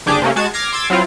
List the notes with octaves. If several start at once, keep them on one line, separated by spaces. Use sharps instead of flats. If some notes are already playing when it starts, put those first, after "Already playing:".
G1 D4 G4 G#4 D6 G6
C3 A3 A#3 C#4
G#3 F#4 A5 G#6
D6 F6 G#6 A#6 C7
C6 D6 E6 G#6 A6
F#3 C4 E4 F4 F5